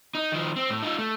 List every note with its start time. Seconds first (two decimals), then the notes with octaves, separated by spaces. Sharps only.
0.15 D#4
0.32 D#3 F3
0.56 C4
0.70 A2
0.83 D#4 F4
0.98 A3